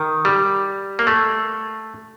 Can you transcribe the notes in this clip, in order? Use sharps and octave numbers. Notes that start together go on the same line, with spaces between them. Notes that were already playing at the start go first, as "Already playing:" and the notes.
Already playing: D#3
G3
A#3
A3